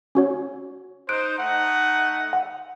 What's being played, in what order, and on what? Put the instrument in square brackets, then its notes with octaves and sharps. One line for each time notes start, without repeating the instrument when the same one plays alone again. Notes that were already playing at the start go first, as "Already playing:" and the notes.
[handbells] C#4 F#4 C#5
[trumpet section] D#4 C5 [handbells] F#6 D7
[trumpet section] A3 D#4 F#5
[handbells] F#5